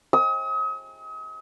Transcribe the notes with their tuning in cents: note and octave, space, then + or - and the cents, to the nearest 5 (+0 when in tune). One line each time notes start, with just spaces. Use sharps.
D#6 +40